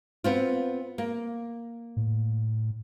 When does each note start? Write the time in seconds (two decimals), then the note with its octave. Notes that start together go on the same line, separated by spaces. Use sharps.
0.24 B3 C4 F4
0.98 A#3
1.96 A2